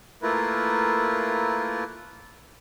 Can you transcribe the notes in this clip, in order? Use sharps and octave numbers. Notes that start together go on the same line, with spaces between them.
A3 A#3 E4 F4 A#4 B4